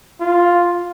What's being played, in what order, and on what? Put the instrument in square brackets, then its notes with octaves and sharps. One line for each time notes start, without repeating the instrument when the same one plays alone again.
[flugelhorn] F4